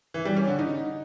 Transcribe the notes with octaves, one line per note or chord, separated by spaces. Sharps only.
E3
G3
C#4
D3
D#4